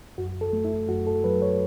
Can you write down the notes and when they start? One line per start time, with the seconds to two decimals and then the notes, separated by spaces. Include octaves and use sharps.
0.18 F#2 F#4
0.41 A4
0.53 A3
0.65 E4
0.89 F#2 F#4
1.07 A4
1.24 F#3 B4
1.42 C#5